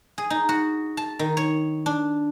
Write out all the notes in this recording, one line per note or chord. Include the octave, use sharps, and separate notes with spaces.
G#4
D#4
F#4
A5
D#3
C#5
D4